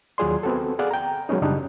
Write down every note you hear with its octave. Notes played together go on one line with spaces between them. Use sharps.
D#2 F#3 F4 G#4 D5 C6
B3 C4 F#4 A4
G#4 D5 F5 F#5
G5 A#5
F#3 G#3 B3 C#4 D#4
F#2 C#3 G3 D4 D#4